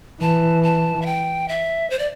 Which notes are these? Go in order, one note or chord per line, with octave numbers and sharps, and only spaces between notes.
E3 A5
A5
E5
G5
E5
C5
D5